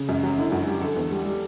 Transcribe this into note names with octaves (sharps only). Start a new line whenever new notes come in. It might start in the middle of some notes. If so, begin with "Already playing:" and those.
Already playing: C#3
F#2
F#3
D3 E4
F#2 F#4
G3 G4
D3 A4
E2
G3
G3